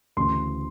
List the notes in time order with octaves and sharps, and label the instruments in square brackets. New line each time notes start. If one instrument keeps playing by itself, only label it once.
[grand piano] D2 C#3 E3 C6